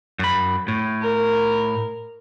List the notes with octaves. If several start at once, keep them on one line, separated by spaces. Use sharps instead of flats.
F#2 B5
A2
A#4